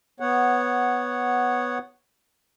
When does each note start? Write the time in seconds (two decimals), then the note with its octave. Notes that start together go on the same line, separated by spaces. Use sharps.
0.20 B3 C#5 F#5